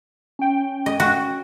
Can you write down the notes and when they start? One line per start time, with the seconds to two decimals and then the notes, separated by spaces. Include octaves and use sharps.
0.39 C#4 G5
0.86 D#5
1.00 F#4